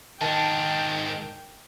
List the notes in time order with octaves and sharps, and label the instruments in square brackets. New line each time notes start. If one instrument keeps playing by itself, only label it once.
[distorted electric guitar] G#2 D4 [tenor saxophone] D#3 [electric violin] G5 [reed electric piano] A5